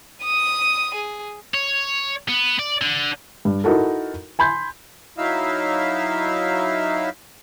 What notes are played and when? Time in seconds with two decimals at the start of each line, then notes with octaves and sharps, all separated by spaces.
0.24 D#6 D#7
0.95 G#4
1.54 C#5
2.29 B3
2.59 D5
2.82 D3
3.45 G2
3.64 D#4 E4 F#4 A4 A#4
4.39 G#5 B5 C6 G6
5.18 F#3 D#4 E4 E5 F5